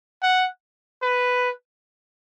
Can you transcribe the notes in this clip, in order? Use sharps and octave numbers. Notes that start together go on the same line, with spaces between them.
F#5
B4